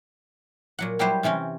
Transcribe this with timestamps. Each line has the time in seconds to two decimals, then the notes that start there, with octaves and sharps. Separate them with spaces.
0.79 A#2 F#3 F#5
0.99 F#3 G3 E4 G4 B4 C5
1.23 C3 E3 C4 C#4